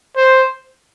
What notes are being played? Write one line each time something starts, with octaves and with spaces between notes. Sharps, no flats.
C5